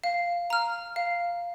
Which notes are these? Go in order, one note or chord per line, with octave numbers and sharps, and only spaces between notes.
F5
A#5 F6
F5